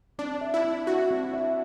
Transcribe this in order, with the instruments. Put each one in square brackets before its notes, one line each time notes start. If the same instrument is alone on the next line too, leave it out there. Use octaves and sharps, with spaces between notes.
[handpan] C4 [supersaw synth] D4
[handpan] E5
[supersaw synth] E4
[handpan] C4
[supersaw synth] F#4 [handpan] E5
[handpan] C4
E5